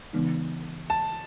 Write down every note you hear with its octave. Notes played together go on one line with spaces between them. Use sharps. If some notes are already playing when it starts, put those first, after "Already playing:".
C#3 E3 G#3 B3 D#4
A5